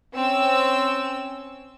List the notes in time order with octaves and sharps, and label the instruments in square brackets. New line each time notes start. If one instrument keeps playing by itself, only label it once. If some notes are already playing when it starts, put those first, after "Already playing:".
[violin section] C4 C#4 E6